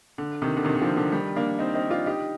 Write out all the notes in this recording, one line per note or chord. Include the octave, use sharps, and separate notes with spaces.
D3
C3 D#3
D3
C3 D#3
D#3
D3 F3
D3 F3
D#3 G3
A#3 D4
C4 D#4
C4 D#4
D4 F4
D#4 G4